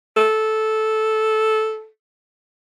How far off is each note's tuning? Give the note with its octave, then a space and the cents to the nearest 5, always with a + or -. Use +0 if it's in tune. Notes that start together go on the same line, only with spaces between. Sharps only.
A4 -10